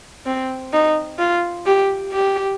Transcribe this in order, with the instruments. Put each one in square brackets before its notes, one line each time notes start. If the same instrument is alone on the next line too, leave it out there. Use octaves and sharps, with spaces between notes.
[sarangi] C4
D#4
F4
G4
G4